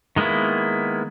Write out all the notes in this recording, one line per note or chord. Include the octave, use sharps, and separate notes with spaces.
D#3 G#3 A#3 B3 E4